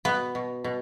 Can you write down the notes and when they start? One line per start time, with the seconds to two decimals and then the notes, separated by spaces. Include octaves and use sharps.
0.05 B2 B3
0.35 B2
0.64 B2